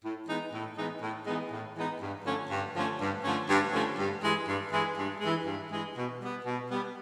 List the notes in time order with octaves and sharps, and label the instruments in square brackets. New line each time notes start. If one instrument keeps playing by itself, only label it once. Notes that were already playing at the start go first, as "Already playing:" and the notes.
[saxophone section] A2
E3 G#3 B3 D#4
A2
E3 G#3 B3 D#4
A2
E3 G#3 B3 D#4
A2
E3 G#3 B3 D#4
G2
D3 F3 A3 C#4
G2
D3 F3 A3 C#4
G2
D3 F3 A3 C#4
G2
D3 F3 A3 C#4
G2
E3 G#3
G2
E3 G#3
G2
E3 G#3
G2
E3 G#3
B2
G3 B3
B2
G3 B3